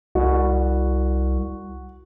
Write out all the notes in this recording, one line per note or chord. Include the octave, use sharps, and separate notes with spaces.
C2 F#4